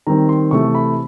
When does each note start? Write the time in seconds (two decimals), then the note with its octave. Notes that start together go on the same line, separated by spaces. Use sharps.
0.07 D#3 G3 C4 A#5
0.29 C6
0.51 C3 E3 A3 C#6
0.75 B5